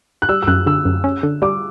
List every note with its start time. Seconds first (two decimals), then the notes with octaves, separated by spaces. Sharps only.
0.22 F#6
0.29 G3 E6
0.43 E6
0.47 F#2 F#6
0.66 D3 E6
0.85 F#2
1.04 C#4
1.23 D3
1.42 G3 D6